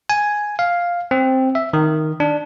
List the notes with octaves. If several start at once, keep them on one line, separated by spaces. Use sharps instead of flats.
G#5
F5
C4
E5
D#3
D4